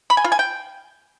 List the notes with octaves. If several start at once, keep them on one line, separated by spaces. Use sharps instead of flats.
B5
G#5
F4
G#5
G5